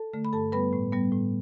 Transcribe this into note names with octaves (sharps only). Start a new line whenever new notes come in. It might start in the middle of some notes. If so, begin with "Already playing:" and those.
Already playing: A4 A5
D3 A3
B5
G2 A4 A5
G3 B3 B4 B5
A2
G3 B3
A2